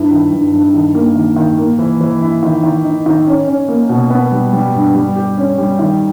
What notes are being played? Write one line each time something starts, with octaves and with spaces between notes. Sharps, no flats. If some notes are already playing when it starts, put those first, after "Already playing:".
Already playing: G2 E4
D#3
G2
G2
D#3
A#3
D#3
D#3
A#3
E3
E3
E4
D#3
D#3
D#4
D#3
C#4
C#4
A#3
B2
B3
G3
G3
G2
G3
G4
C#4
G3
D#3